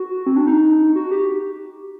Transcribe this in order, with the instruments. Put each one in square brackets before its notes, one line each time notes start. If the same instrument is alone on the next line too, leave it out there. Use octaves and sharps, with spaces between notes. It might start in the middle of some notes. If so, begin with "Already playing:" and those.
Already playing: [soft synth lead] F#4
C4
D4
D#4
F#4
G4